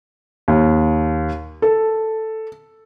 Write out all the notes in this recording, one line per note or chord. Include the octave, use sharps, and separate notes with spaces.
D#2
A4